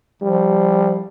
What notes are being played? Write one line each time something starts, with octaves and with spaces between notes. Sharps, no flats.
F3 G3